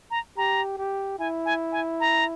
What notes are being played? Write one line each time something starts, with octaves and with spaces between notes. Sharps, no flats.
A#5
G4 A#5
G4
E4 G#5
G#5
G#5
A#5